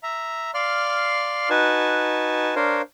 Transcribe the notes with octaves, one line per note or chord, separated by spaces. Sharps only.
E5 A#5
D5 F5 C6 F6
D#4 F#4 B4 G#5 A5
D4 A#4 C5 C#5 F5